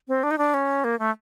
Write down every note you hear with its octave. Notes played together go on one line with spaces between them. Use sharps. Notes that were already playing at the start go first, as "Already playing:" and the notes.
C4
D4
D#4
D4
C#4
A#3
A3